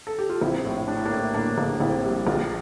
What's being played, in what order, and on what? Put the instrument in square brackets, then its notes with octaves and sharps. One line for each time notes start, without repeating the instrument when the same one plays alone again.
[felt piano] A4
G4
F4
A#1 C4 E4
A2
A2 D4
E4
A#3 D4
A2
A2 A#3 D4
A#1
A#1 C4 E4
G3
A#1 D4 F4